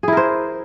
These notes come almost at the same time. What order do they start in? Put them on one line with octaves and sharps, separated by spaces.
G#4 E4 A#4 C5